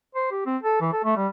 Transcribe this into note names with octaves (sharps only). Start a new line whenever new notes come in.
C5
G4
C4
A4
E3
A4
A3
G3